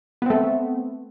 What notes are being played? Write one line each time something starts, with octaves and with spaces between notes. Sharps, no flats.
A3 B3 C4